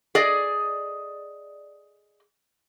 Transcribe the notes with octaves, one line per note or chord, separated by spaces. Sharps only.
G#4 D5 D#5